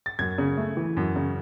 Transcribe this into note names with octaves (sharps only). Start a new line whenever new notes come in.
A6
F#2 G#6
C#3
A3
E3
F#2
C#3